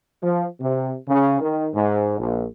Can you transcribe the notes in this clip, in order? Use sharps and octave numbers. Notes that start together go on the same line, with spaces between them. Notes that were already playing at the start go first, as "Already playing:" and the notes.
F3
C3
C#3
D#3
G#2
A#1